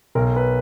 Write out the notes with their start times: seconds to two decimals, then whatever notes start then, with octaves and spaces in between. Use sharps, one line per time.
0.15 B1 A#4
0.36 B4